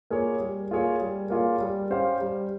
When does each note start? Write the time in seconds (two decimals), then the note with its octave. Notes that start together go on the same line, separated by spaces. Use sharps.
0.10 A#3 F4 G#4 C#5
0.40 G3
0.71 A#3 F4 G#4 C#5
1.01 G3
1.30 A#3 F4 G#4 C#5
1.60 G3
1.90 C#4 G4 C5 F5
2.21 G3